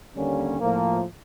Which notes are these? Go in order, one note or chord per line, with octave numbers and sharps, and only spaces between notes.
D#2 D3 G3 A#3 C#4
A2 F3 A#3